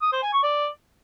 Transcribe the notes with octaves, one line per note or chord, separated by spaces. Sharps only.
D#6
C5
G#5
C#6
D5